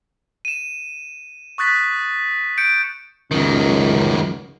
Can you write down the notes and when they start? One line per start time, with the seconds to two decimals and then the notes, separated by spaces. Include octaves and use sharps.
0.45 D#7 E7
1.58 C#6 D#6 F#6 A6 B6
2.58 G6 C#7 D7
3.31 C#2 F#2 D#3